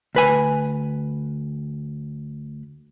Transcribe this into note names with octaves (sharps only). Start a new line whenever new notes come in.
D2 B4 G#5